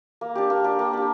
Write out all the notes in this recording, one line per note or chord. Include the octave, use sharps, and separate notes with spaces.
A#3
D4 G4
A#3
D4 G4
A#3
D4 G4